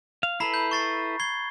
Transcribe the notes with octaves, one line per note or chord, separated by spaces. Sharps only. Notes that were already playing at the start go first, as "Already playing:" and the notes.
F5
E4 A4 B4 A#5 B5 C7
G6
C#6 A6 C7
G#6 C7 G7